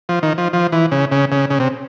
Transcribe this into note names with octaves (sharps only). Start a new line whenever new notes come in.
F3
D#3
F3
F3
E3
C#3
C#3
C#3
C#3
C3